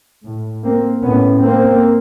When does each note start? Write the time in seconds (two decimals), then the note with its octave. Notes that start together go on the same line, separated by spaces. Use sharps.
0.25 A2
0.64 A#3 C4
1.02 A2 B3 C#4
1.40 A#3 C4